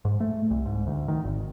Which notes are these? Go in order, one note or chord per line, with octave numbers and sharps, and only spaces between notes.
G#2
A3
C2
G#2
D2
D#3
G#1